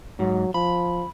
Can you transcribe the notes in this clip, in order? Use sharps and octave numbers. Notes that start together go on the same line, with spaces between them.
G#2 F#3
F3 B5